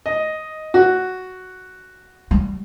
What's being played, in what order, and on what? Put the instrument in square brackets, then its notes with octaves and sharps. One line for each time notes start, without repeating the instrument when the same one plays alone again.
[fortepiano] D#5
F#4
[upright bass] G3